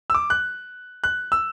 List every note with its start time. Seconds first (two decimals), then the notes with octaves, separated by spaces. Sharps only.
0.10 E6
0.15 D6
0.30 F#6
1.04 F#6
1.32 E6